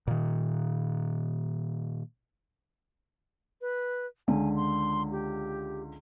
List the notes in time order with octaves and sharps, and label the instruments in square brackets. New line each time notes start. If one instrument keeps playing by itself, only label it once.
[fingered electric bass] A#2 D#3
[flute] B4
[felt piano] C#2 D3 [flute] G#5
[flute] C6
G4